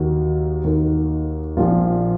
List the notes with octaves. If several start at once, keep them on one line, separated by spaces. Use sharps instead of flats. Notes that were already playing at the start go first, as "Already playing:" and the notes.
Already playing: D#2 D#3 F#4
D#2 D#3
A#1 A#2 F3 F4